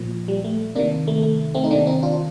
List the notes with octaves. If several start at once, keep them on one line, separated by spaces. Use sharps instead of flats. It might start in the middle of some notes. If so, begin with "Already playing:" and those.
Already playing: A#2 F3
G3
A3
C3 D#3 A#3 D4
A3
A3
A3 C4
D#4
C3 D#3 A#3 D4
C4 D#4
D4 F4